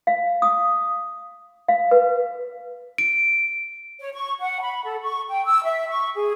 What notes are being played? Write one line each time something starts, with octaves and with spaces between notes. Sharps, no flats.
F5
D#6
F5
B4
D7
C#5
C#6
F#5
B5
A4
C#6
G5
E6
E5
C#6
G#4